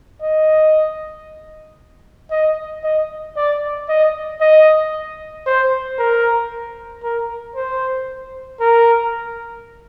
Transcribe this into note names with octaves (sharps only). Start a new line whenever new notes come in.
D#5
D#5
D#5
D5
D#5
D#5
C5
A#4
A#4
C5
A#4